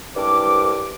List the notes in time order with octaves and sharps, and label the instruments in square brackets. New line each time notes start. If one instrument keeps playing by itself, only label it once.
[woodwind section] C2 G2 D6